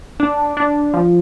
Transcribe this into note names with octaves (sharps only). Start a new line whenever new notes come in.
D4
D4
F3